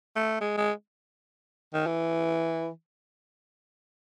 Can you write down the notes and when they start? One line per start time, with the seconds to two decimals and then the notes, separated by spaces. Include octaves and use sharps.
0.16 A3
0.41 G#3
0.57 G#3
1.74 D#3
1.87 E3